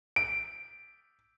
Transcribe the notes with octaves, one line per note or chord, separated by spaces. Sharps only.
D7